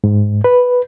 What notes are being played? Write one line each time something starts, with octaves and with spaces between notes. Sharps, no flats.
G#2
B4